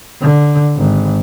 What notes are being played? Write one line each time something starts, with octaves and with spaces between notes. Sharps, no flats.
D3
G#1